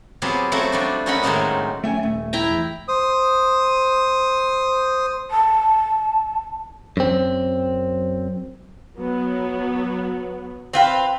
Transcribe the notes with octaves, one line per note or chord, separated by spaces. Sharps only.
F#3 B3 C4 F4 G4 G#4
F3 F#3 A3 C4 F#4
F3 G3 D4
C4 C#4 A#4 D#5 F#5 B5
A2 D#3 F#3 G#3 A#3 D#4
A3 A#3 C#4 E5 G5 G#5
D#1 A3
E4 G5 A#5
E2
C5 D#6
A5
F#2 C4
F#3 B3
C4 F4 B4